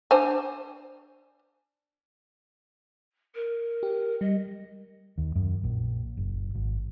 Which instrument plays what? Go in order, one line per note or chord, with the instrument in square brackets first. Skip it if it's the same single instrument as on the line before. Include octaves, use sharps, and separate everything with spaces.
[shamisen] D4 C5 G#5
[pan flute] A#4
[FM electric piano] G4
[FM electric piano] G3 [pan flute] D#5
[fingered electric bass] D#2
F#2
A#1
F#1
G#1